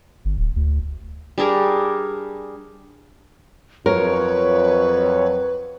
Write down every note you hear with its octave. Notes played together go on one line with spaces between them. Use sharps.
G1
D1
D2
G3 D4 G#4 A#4
F2 F#3 A#4 B4 C#5